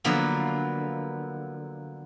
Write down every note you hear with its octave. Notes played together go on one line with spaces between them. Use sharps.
D3 F3 F#3 A#3 B3